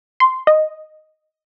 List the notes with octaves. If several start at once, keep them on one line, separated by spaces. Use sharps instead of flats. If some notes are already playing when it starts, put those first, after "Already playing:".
C6
D#5